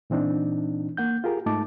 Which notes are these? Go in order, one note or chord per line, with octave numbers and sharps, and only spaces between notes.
A#2 E3 C4 D4 D#4
A#3 F#5 G6
F4 G4 G#4 A#4
G#2 A3 D#4 A5 D6